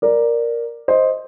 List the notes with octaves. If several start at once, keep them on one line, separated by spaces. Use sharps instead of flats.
A#4 D5
C5 D#5